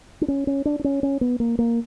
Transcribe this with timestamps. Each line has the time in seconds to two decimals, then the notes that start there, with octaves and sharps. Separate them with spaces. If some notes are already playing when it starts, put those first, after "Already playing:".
0.21 D4
0.28 C#4
0.47 C#4
0.65 D4
0.79 D4
0.84 C#4
1.03 C#4
1.21 B3
1.40 A#3
1.59 A#3